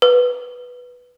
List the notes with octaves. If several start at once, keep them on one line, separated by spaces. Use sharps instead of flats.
B4